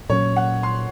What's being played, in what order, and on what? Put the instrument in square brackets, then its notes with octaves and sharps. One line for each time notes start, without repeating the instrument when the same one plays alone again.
[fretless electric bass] A#2 F#3 C#4 [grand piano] C#5
[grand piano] F#5
C6